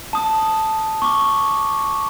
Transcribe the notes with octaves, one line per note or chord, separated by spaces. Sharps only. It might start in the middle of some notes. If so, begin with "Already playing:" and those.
A5 D#6
C#6 D6